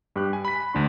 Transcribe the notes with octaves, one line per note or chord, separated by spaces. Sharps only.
G2 G4 F#6
G#5
B5 B6
D2 D4 C6